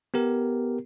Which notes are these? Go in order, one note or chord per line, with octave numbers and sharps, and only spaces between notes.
B3 G4 A#4